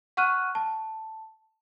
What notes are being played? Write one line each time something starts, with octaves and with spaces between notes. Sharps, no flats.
F#5 C#6 F6 F#6 D#7
A5